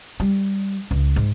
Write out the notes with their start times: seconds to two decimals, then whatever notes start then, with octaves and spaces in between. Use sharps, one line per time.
0.20 G3
0.91 C#2
1.16 G#2